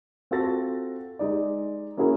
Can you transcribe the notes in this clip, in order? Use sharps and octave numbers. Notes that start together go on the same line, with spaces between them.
C4 F4 F#4 A4 A6 A#6
G#3 D#4 D5
A#3 C#4 E4 F#4 G#4 A#4